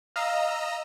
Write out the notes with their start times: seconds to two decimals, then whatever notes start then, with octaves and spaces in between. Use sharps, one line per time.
0.16 D#5 F5 A#5 E6